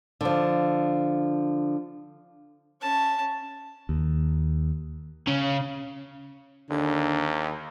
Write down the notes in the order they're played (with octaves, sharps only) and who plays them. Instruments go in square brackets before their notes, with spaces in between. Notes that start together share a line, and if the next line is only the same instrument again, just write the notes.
[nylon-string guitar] D3 F3
[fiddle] C#4 A5
[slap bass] D#2
[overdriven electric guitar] C#3
[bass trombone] D#2 [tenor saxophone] D3